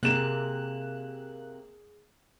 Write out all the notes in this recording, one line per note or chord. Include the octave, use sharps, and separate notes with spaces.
C3 A#3 G#4 F#6 E7